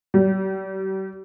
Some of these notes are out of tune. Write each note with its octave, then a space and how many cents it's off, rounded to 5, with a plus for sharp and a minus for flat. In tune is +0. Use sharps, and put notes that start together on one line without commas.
G3 -40